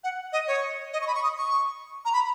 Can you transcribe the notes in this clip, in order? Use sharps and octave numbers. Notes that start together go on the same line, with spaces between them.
F#5
D#5
C#5
D#5
C#6
B5
C#6
D#6
C#6
A#5
B5